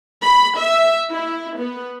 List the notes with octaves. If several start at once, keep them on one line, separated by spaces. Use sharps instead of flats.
B5
E5
E4
B3